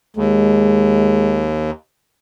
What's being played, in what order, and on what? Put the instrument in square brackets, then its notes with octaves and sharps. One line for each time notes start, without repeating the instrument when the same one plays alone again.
[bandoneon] D#2 [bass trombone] G#3